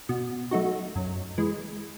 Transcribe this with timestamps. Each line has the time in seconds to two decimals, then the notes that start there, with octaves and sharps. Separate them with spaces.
0.09 B2
0.51 F#3 A3 D#4 F#4
0.96 F#2
1.38 E3 G#3